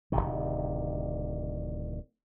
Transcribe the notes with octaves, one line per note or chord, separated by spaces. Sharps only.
D1 C#2 C3 D#3